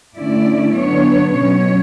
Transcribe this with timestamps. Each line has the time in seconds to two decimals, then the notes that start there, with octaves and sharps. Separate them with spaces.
0.16 D3 A3 C#4 E4 D5
0.74 D3 F#3 B3 D4 C#5
1.34 B2 F#3 C#4 C#5